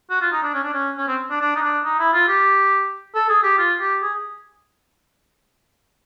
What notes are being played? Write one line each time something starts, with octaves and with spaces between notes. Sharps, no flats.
F#4
F4
D#4
D4
C#4
D4
C#4
C#4
C4
D4
D4
D#4
D4
D#4
E4
F4
G4
A4
G#4
G4
F4
G4
G#4